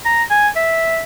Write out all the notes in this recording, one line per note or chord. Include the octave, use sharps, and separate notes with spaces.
A#5
G#5
E5